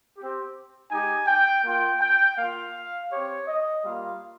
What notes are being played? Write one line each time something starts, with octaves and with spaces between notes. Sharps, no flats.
C4 G4
G#3 D#4 G4 G#5
G5
A#3 F4 G5
G5
A#3 F4 F5
C4 G4 C#5
D#5
G3 A#3 F4 F5